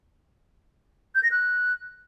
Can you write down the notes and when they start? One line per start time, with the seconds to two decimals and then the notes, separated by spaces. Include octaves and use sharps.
1.15 G6
1.23 A#6
1.31 F#6